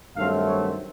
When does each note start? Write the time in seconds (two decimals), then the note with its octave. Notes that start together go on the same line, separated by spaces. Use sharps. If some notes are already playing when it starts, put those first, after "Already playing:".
0.17 G2 D#3 F#3 A3 C4 F5
0.46 C#5